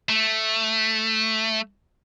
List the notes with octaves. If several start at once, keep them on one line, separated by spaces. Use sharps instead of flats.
A3